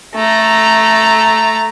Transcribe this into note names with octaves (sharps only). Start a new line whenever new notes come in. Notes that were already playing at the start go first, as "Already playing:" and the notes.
A3 A#5